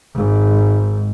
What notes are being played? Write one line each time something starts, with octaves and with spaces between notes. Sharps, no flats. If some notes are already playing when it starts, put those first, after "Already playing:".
G#1 G#2